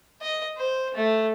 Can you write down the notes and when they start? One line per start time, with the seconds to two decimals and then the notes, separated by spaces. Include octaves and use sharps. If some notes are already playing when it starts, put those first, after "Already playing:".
0.22 D#5
0.58 C5
0.94 A3